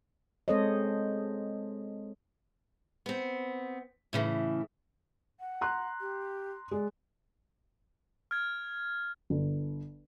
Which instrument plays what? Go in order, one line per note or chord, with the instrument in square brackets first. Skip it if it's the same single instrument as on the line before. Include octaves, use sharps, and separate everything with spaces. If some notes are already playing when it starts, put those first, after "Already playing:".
[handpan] G#3 C4 A4 C5 C#5 D#5
[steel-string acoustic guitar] B3 C4
A2 C#3 E3
[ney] F#5
[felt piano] A#5 C6 F#6
[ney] G4
[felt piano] G#3 [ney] D5
[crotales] F6 G#6
[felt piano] G1